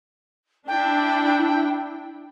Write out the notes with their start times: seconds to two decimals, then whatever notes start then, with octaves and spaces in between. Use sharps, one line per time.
0.68 D4 E4 G5